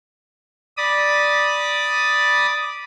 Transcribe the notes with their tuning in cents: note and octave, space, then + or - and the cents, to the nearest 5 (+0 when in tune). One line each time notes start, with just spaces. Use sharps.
D5 +0 B5 -15 D#6 +0